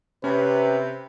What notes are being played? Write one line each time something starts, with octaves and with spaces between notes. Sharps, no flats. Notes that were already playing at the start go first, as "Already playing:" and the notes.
C3 C#4 B4